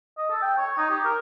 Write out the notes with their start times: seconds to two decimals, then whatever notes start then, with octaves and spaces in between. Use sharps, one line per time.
0.18 D#5
0.30 A4
0.42 G5
0.58 C#5
0.78 D#4
0.90 G4
1.04 A#4